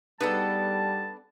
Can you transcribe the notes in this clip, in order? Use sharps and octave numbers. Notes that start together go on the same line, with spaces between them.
G3 B3 D4 D#4 G#4 A4 B4 A5